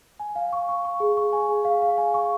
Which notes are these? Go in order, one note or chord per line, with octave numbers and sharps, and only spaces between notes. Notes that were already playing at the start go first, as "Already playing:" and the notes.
G#5
F5
C#6
C#6
C#6
G#4
C#6
G#5
G#4
F5
F5
G#5
C#6